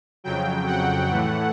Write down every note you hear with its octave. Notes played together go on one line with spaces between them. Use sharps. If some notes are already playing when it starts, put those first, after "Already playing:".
F2 C#3 F#3 G5
F#5
A2 E3 A3